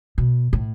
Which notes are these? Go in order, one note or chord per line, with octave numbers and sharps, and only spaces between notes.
B2
A2